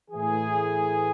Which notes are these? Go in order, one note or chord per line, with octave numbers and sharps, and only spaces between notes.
A2 E3 G#4